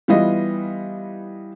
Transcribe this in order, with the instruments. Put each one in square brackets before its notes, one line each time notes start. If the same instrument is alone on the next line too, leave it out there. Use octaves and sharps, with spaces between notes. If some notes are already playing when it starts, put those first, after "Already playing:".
[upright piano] E3 G3 B3 F4 D#5